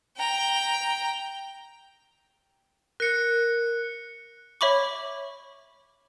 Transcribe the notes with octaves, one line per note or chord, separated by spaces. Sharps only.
G5 A#5
A#4 F#6 C#7
C#5 E5 B5 C#6 D6